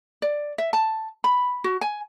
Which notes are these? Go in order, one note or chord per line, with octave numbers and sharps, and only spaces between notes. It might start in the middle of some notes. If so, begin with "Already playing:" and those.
D5
E5
A5
B5
F#4
G#5